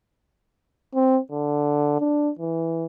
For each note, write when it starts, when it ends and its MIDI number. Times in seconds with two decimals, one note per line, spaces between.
0.95 1.19 60
1.32 1.98 50
2.00 2.30 62
2.39 2.86 52